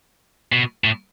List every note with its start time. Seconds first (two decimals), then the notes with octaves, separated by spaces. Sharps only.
0.52 B2
0.84 A2